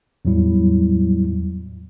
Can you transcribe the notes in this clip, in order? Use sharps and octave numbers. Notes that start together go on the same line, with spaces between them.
E2 A2 F#3 G3 E4